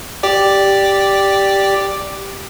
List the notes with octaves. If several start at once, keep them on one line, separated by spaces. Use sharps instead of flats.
G4 D5